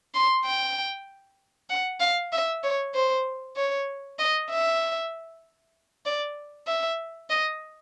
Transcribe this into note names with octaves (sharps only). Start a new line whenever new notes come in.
C6
G5
F#5
F5
E5
C#5
C5
C#5
D#5
E5
D5
E5
D#5